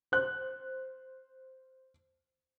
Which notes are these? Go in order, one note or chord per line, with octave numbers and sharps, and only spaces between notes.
C5 F#6